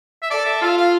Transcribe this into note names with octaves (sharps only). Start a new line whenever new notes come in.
E5
A4 D5
E5
F4 F5
F5